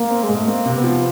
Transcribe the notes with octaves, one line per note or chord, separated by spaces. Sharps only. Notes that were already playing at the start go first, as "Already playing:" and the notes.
Already playing: A#3
C4
G#3
G#2
A3
A#3 C4
C3
B3
F3